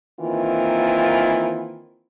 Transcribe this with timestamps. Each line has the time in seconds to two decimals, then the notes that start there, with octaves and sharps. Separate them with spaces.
0.20 D#3 E3 A#3 C4 F4